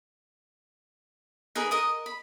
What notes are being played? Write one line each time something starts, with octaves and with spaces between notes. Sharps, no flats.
D#4 G#4 A#4 B4
A#4 D#5 D#6
B5